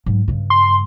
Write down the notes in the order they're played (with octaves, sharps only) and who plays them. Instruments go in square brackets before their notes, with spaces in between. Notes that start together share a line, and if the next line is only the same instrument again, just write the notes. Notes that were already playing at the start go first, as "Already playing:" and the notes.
[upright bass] G#2 F#3
G2 C#3
[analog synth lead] C6